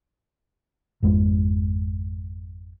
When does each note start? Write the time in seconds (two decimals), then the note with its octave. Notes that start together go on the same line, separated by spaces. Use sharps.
1.03 G#1 F2 G#3